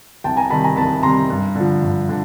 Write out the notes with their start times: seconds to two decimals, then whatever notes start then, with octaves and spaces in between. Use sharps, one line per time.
0.24 C2 G5 A5
0.37 G#5 A#5
0.50 C3 D#3 G3 A5 B5
0.64 G#5 A#5
0.76 C2 A5 B5
1.03 C3 D#3 G3 A#5 C6
1.30 G2
1.55 D3 F3
1.83 G2
2.09 D3